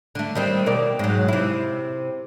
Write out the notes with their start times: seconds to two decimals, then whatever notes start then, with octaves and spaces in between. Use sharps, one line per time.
0.15 D3 A3
0.35 D#3 G3 C4
0.66 B2 A#4 D5
0.99 G#2 F#3
1.28 C3 E4